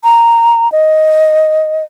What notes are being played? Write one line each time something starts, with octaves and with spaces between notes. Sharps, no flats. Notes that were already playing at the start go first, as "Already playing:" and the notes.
A#5
D#5